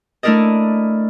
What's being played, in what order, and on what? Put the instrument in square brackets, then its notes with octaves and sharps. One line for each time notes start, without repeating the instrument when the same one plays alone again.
[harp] A3 D4 E4 A#4 D5 D#5